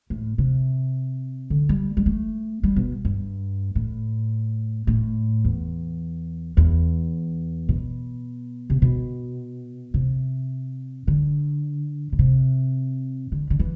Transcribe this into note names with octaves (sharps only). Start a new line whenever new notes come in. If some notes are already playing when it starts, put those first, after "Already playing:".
A2
C3
D3
G3
G3
A3
G3
B2
G2
A2
A2
E2
E2
B2
C3
B2
C3
D3
D3
C3
D3
D3
E3